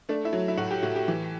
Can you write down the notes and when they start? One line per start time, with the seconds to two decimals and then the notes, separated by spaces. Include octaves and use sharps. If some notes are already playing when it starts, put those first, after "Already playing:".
0.09 A3 D4
0.25 E4
0.33 F#3
0.48 E4
0.57 A2 F#4
0.71 G4
0.82 A2 F#4
0.96 G4
1.08 E3